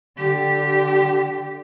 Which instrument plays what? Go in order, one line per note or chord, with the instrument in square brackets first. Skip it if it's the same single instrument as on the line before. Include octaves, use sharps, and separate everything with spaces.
[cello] D3 G4